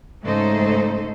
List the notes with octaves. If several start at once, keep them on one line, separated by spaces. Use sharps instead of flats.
G#2 C#3 A3 D#4 A4 C5